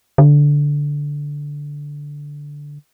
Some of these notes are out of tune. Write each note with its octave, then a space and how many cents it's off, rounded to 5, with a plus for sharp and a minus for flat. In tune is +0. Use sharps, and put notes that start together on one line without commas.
D3 -10